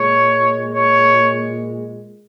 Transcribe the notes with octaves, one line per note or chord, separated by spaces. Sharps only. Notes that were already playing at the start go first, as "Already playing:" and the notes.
Already playing: A#2 G#3 C#5
C#5